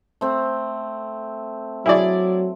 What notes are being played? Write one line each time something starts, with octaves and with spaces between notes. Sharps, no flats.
A3 C4
F#3 E4 G#4 D5